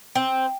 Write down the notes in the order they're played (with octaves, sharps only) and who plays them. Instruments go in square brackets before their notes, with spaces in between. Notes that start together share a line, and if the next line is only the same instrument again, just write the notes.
[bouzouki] C4